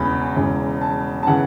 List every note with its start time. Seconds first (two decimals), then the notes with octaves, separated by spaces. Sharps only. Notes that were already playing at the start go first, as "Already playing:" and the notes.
Already playing: E1 E2 C#3 E3 B5
0.36 E1 E2 C#3
0.82 A5
1.23 A5
1.27 C#3 E3 F#5